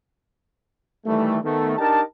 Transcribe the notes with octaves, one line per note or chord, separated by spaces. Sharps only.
D#3 E3 G3 A3
D#3 A3 B3
D4 D#4 G4 A#4 A5